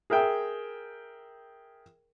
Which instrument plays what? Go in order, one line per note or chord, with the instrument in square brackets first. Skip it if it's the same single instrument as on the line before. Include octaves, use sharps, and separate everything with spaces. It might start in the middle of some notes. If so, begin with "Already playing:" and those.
[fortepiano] G#4 A#4 E5 G5